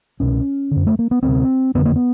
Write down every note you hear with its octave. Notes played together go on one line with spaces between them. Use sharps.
C2 B2 C#4
F#2 D3
A3
A#3
B3
D2 C3 C4
F2 D3 B3
A#3
B3